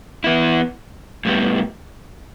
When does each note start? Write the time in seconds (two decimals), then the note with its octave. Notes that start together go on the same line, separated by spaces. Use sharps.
0.24 E3 B3 E4
1.25 A2 G3 B3